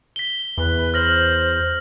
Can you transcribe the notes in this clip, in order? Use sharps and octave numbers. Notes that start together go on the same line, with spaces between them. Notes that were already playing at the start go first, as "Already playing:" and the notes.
B6 G7
E2 B4
C5 F6 A#6 F#7